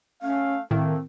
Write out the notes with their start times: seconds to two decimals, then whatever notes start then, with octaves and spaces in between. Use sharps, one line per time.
0.23 A3 C#4 F5
0.71 A2 D#3 A3 A#3 C4